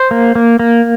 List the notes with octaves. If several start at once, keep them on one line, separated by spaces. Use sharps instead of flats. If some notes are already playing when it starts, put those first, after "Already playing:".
Already playing: C5
A#3
A#3
A#3